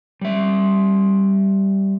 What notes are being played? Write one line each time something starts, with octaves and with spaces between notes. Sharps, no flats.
G3 E5